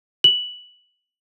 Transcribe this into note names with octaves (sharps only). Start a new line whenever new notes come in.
F#7